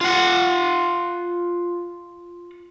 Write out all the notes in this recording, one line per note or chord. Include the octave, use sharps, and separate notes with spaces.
F4 F#5